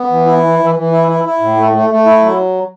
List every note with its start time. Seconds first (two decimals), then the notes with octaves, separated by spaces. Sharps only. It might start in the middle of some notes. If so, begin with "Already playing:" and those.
Already playing: B3
0.10 E3
0.26 E4
0.43 E3
0.59 E3
0.75 E3
0.91 E4
1.08 E4
1.25 E4
1.40 A2
1.57 A3
1.73 A3
1.90 A3
2.06 E4
2.22 F#3